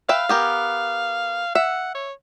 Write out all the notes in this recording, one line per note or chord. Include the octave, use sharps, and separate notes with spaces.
B4 E5 F5 G5
B3 G4 A#4
E5 F#5
C#5